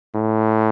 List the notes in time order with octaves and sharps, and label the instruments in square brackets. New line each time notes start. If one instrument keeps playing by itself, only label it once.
[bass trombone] A2